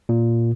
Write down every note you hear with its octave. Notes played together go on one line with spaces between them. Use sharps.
A#2